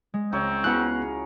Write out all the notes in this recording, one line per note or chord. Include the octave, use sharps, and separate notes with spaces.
G#3
C#2 C4 A#4 C#5
B3 E4 F#4 G#4 A#4 F#5 F#6